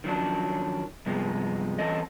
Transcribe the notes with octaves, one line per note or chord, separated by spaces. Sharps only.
D#3 F3 F#3 C#4 D4
G2 C3 F3 G#3 B3
E3 C4 C#4 A4 D#5